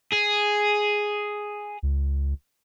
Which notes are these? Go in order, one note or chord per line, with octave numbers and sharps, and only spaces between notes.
G#4
C#2